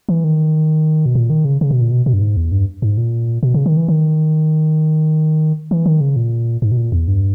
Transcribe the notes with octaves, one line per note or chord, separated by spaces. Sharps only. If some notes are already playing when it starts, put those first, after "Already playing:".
E3
D#3
B2
A#2
D#3
C#3
C#3
B2
A#2
B2
B2
G2
G#2
E2
G2
G#2
A#2
B2
C#3
D#3
E3
D#3
E3
D#3
C#3
A#2
G#2
B2
A#2
E2
G2